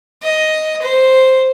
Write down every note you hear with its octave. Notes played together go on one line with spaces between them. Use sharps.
D#5
C5